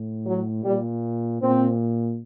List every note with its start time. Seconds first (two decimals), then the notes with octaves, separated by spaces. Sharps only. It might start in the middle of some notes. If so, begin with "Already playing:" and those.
Already playing: A2
0.26 F#3
0.64 A#2 G3
1.41 A#2 C4